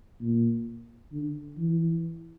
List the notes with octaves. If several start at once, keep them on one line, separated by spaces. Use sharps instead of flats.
A#2
D3
E3